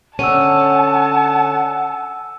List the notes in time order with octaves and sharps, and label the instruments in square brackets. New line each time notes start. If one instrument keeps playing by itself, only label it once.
[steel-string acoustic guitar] D3 C#4 [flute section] F#5 G#5 [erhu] A5 [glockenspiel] E6 D#7